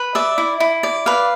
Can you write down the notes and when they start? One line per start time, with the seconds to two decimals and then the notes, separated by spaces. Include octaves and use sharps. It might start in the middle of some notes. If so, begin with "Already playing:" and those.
Already playing: B4
0.15 D5 E5
0.38 E4
0.60 E4
0.83 D5
1.06 B4 F5